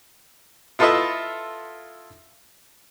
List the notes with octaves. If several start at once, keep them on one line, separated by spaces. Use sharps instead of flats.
E4 F4 A4 B4 D#5 E5